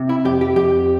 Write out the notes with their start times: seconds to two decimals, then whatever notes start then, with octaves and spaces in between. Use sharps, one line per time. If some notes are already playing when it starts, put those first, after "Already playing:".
Already playing: C3
0.09 E4
0.25 F2 G4
0.41 G4
0.56 F2 G4